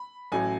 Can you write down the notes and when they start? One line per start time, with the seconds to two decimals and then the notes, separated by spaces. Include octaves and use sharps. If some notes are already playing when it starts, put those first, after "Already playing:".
Already playing: B5
0.32 A1 A2 F#3 G#5